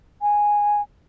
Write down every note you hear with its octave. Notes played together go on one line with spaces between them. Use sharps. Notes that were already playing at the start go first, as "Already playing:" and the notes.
G#5